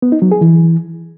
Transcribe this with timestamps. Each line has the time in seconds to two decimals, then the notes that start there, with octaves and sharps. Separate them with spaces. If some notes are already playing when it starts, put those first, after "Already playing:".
0.02 B3
0.12 D#4
0.22 F#3
0.32 G#4
0.41 E3